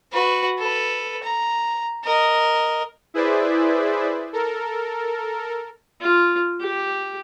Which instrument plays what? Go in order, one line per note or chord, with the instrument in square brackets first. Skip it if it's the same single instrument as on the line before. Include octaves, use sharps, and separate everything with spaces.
[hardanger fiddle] F#4 B4
A4 B4
A#5
A#4 D#5
[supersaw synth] E4 G#4 B4 C5 D5 E5
A4 A#4
[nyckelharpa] F4
G4